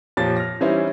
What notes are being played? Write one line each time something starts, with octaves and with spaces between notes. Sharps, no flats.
F2 A#2 F3 G4 C#5 A6
F6 A#6
E3 G3 C#4 D#4 E4 C5